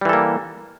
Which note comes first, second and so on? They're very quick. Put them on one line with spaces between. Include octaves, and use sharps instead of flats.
G3 E3 A4 A#3